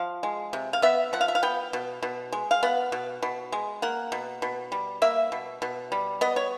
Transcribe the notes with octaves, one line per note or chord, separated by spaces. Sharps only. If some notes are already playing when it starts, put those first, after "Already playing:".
Already playing: F3 F5
G#3
C3
F5
B3 E5
F3 F#5
F5
E5
F5
B3 G5
B2
B2
G#3
F5
B3 F#5
B2
B2
G#3
A#3 F#5
B2
B2
G3
A#3 E5
B2
B2
G3
B3 D#5
C#5